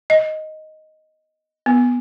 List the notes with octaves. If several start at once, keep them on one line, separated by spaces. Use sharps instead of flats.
D#5
B3